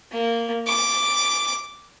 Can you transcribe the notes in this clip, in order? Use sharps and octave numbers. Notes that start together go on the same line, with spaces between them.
A#3
D6